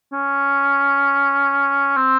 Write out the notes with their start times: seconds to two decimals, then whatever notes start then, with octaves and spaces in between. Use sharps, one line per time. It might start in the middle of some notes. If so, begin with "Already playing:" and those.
0.13 C#4
1.97 C4